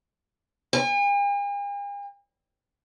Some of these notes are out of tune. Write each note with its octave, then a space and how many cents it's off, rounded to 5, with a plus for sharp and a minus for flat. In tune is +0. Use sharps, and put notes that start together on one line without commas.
G#5 -45